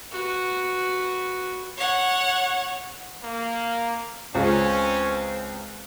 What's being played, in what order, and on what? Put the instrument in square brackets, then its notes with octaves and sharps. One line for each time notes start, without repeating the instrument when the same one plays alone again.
[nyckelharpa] F#4 B4
[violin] C#5 F#5
[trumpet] A#3
[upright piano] C#2 G#3 [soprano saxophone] C4 [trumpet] C#4